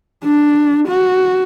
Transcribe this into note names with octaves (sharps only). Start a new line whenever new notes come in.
D4
F#4